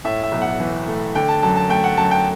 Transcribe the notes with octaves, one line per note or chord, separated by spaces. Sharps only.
A2 E5
E5
B1
F#5
E3
A3
D3 G5
A5
F#2 A5
A5
A3 G5
F#5
F#2 A5
G5